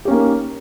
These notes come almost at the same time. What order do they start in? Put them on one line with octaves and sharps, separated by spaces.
G4 C#4 A#3 D#4